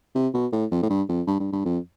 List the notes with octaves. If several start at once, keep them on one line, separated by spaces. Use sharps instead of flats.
C3
B2
A2
F2
A2
G2
F2
G2
G2
G2
F2